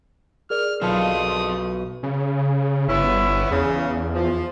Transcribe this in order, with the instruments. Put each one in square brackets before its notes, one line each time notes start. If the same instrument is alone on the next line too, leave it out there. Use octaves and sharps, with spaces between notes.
[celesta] G#4 A#4 D5 [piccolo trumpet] F6
[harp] B1 F4 D#5 [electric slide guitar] C4 A4 A5 [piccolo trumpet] D#6
[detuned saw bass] C#3
[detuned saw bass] G1 [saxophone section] B3 C#4 E4
[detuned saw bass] E2 [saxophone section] C#3
[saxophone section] F3